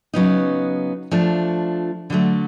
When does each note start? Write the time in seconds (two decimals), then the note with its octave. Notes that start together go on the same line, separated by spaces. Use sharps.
0.13 C#3 F#3 B3 D#4
1.11 F3 A3 D4
2.10 D3 F#3 A3